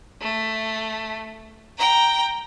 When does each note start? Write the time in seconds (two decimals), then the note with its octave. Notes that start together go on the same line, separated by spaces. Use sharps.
0.22 A3
1.78 G5 A#5